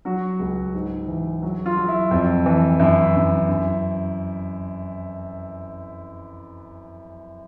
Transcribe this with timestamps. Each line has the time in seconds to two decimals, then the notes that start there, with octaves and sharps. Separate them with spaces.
0.05 F#3 F#4
0.39 C#2
0.74 G#2
1.08 E3
1.42 F#3
1.66 F4
1.77 F#3
1.89 E4
2.11 F2
2.46 E3
2.80 F#2 E4
3.15 F#2
3.49 F#2